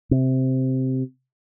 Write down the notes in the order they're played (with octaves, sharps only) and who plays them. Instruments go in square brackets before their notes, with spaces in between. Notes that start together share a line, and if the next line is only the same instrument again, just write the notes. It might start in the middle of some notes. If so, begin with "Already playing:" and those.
[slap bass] C3